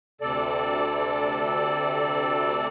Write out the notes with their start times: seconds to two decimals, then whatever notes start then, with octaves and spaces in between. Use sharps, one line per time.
0.21 D2 C3 A4 D5